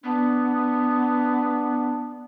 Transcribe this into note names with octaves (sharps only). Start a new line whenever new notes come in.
B3 D4